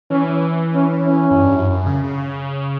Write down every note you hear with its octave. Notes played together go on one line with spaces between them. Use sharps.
E3 C#4
C#4
C#4
F#2
G2
F#2
F#2
C#3
C#3